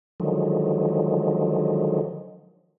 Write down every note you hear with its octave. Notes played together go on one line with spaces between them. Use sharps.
D3 D#3 F3 F#3 G#3